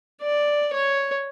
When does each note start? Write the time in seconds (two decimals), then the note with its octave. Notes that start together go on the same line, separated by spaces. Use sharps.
0.22 D5
0.74 C#5